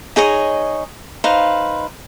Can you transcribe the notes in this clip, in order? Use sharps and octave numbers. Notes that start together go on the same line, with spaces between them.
D#4 G#4 C#5 D#5
D#4 B4 C5 F5